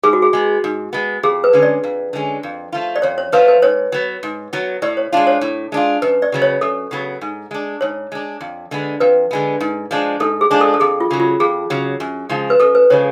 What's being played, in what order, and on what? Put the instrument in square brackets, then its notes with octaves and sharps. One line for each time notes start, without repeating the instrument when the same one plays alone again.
[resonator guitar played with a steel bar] G#2 [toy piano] G#4
[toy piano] F#4
G#4
[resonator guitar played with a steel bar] G#3 B3
G#2
G#3 B3
[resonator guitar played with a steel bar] F2 [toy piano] G#4
[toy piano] B4
[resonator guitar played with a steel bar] D3 G#3 C#4
[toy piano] D5
[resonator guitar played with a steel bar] F2
D3 G#3 C#4
F2
F3 A3 F4
[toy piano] D5
[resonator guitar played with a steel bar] F2 [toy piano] C#5
[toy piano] C#5
[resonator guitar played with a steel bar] F3 A3 F4 [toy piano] B4
[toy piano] B4
[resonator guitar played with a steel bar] G#2 [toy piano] C#5
[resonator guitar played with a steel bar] F#3 B3
G#2
F#3 B3
[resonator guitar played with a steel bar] A2 [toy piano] D5
[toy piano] C#5
[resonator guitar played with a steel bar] G#3 D4 F4
[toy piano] C#5
[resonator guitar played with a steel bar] A2
G#3 D4 F4
[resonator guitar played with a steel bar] F#2 [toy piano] B4
[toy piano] D5
[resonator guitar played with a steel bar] C#3 F#3 B3
[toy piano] C#5
[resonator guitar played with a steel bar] F#2 [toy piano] A4
[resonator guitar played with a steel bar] C#3 F#3 B3
G#2
G#3 D4
[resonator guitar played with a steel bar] G#2 [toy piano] C#5
[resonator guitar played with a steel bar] G#3 D4
F2
D3 G#3 B3
[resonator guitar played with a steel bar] F2 [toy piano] B4
[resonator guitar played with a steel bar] D3 G#3 B3
G#2
F3 G#3 D4
[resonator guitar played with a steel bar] G#2 [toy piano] A4
[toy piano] G#4
[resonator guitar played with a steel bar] F3 G#3 D4
[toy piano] A4
A4
[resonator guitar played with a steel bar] F2 [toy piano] G#4
[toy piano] F4
[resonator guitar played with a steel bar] C#3 F#3
[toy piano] F4
[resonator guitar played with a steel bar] F2 [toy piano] G#4
[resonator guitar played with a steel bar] C#3 F#3
F#2
C#3 F3 G#3
[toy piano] B4
[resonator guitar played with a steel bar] F#2 [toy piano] A4
[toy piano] B4
[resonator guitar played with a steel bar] C#3 F3 G#3 [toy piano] C#5